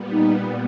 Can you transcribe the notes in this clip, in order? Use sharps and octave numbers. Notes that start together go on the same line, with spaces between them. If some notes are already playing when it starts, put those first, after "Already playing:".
Already playing: A#2 G3 B3
D#4